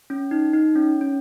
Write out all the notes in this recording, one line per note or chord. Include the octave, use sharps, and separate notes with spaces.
C#4
D#4
D#4
C#4
C#4